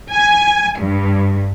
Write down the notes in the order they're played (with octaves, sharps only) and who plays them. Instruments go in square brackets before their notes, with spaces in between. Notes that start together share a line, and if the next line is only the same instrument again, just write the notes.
[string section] G#5
G2